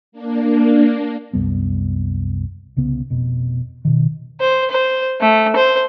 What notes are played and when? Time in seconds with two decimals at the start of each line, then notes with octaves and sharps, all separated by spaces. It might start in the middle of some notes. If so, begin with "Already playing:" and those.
0.12 A#3 D4
1.33 C2 F#2 G3 B3
2.77 C2 C#3 B3
3.10 F1 B2
3.85 B2 D#3
4.40 C5
4.70 C5
5.21 A3
5.56 C5